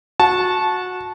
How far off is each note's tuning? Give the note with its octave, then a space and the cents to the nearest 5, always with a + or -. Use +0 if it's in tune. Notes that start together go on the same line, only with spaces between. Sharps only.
F#4 -20 A5 -15